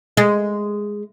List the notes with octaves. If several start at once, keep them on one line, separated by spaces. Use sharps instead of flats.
G#3